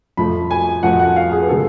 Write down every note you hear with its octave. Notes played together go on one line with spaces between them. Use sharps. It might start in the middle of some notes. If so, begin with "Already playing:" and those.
F2 F3 A3 B5
G#5
F2 F3 A3 F#5
F#5
F5
G#4
B4
D3 G#3 A4